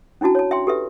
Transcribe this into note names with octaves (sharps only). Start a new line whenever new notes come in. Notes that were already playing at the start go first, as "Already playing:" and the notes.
C#4 D4 E4 F#4 A5
C#5 A5
E5 G5 C6
G4 A4 B4 E5